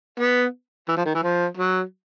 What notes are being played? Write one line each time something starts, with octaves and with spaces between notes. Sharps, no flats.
B3
E3
F3
D#3
E3
F3
F#3